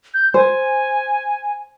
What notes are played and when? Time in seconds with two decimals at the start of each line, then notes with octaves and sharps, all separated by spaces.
0.14 G6
0.34 C5 G#5